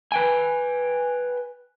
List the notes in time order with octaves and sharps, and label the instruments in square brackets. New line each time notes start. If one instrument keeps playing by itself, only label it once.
[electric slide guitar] B4 G5 G#5